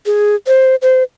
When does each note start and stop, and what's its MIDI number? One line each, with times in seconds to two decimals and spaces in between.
0.06 0.35 68
0.47 0.76 72
0.82 1.03 72